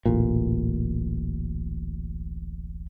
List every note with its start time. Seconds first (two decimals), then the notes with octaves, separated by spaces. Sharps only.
0.05 D1 A1 A#2